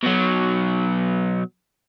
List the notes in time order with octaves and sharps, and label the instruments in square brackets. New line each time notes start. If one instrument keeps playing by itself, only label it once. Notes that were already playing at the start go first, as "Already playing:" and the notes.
[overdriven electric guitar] B2 F#3